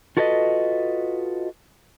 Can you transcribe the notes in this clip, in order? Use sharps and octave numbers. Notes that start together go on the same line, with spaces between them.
F4 F#4 A4 B4 C#5 D#5